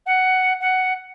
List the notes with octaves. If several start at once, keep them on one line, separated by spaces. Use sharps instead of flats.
F#5
F#5